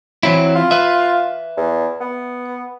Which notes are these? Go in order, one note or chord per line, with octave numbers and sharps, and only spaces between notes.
E3 F#3 C4 E4
F4
B4 E5
E2
B3